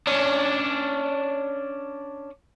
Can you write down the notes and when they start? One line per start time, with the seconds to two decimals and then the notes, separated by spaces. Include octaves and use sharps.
0.07 C#4 D4